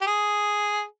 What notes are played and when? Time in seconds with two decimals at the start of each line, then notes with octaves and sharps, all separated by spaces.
0.01 G4
0.07 G#4